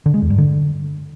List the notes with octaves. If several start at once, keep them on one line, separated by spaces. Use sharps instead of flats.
D3
G#3
E2
G2
D3